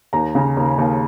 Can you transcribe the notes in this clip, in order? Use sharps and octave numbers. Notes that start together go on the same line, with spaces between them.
D#2 A#5
C#3
D#2
D#2